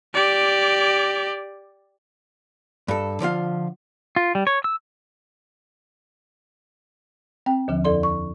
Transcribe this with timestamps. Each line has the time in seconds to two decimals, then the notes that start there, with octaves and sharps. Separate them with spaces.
0.14 G4 D5
2.88 G2 A4
3.20 D3 F3 F4 F5
4.16 F4
4.35 G3
4.47 C#5
4.64 E6
7.46 C4 G5
7.68 D#2 D3 F3
7.84 F2 A4 D5 C6
8.03 C#6